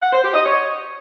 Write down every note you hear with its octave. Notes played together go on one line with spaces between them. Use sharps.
F#5
C5
G4
D#5
C#5